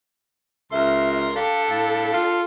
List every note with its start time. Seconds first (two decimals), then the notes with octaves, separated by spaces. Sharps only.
0.72 C#2 A#4 E5 C6
1.36 D4 G4 A4 F5
1.70 A2 F5
2.13 F4